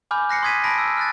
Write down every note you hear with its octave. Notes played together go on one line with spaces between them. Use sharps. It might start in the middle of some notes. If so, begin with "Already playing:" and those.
G#5 B5 D6 F6 G6
F#6 A#6 C7 C#7
C6 D#6 G#6 B6 D#7
A5 B5 A#6 D7
E6
F6 F#6 A6